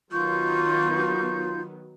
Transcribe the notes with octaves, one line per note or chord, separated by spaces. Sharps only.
D#3 F#3 B3 D#4 F4 F5 C#6 G6